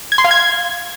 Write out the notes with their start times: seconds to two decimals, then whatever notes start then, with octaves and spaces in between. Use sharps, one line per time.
0.12 G#6
0.18 C6
0.25 F5
0.31 G#6